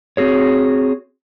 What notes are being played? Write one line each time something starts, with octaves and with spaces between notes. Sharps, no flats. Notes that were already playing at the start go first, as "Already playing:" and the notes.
C4 F#4 G#4 C#5